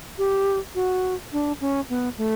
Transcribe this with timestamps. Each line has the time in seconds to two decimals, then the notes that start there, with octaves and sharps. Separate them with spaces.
0.18 G4
0.75 F#4
1.33 D4
1.61 C#4
1.89 B3
2.18 A3